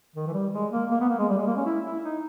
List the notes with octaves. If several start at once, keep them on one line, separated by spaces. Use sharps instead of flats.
D#3
E3
G3
G#3
A#3
A#3
B3
A#3
G#3
G3
G#3
A#3
C#4
E4
E4
D#4